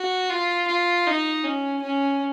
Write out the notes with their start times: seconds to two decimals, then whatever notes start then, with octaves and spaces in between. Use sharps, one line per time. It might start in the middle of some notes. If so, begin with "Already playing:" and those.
Already playing: F#4
0.30 F4
0.67 F4
1.07 D#4
1.44 C#4
1.82 C#4